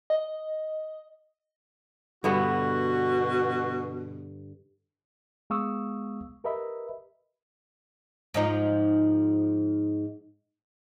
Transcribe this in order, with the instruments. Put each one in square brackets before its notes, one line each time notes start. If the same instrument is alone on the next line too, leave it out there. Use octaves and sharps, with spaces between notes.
[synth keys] D#5
[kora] G2 D3 B3 [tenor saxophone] B2 [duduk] F#4
[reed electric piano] G#3 B3 F5 C#6 D#6 E6
G4 A#4 B4 D#5 E5 B5
[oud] G#2 F3 D#4